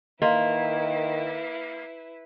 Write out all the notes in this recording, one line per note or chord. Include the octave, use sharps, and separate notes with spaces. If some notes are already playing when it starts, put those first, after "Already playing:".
D#3 A#3 E4 B4 D#5 F5 C6